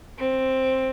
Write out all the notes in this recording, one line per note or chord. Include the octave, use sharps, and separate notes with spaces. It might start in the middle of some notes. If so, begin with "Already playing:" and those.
C4